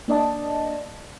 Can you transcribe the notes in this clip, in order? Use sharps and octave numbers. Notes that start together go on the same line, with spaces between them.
A#3 D4 D5 D#5 A5